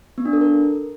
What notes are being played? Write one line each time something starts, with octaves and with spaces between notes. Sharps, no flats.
B3
D4
A4
A#4